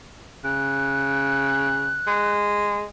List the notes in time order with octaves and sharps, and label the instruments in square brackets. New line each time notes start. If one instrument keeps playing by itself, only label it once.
[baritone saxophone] C#3 [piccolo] F#6
[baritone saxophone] G#3